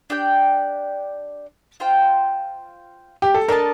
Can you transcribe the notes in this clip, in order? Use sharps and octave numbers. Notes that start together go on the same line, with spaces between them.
D4 G4 D5 G5
F4 C5 G5
G4
A4
D4 A4 A#4 D#5 A5